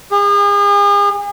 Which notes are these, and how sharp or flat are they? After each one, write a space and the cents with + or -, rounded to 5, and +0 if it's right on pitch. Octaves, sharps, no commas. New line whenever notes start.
G#4 -40